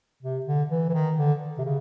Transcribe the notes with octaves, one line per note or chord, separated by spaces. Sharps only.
C3
D3
E3
E3
D#3
D3
C3
C#3